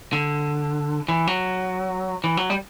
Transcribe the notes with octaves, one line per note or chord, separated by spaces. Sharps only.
D3
E3
F#3
E3
F#3
G3